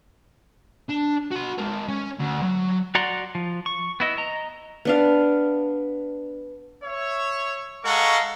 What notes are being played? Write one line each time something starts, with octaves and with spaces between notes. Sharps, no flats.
D4
F#4 C6
G#3 A#4
C#4
D2
F#3
F#4 D5 F#5 A#5 C6
F3
C#6
B3 E4 D#5
D#5 A#5
B3 D4 F5
C#5 E5
G#3 A4 F5 F#5 A#5 C#6